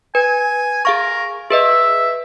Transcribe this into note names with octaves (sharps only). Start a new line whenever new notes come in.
B4 G#5
G#4 A#4 F5 C#6
G#4 B4 D#5 E5